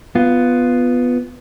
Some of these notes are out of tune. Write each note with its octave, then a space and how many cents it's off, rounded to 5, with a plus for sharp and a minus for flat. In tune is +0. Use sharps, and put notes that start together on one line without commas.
B3 +5 F4 +0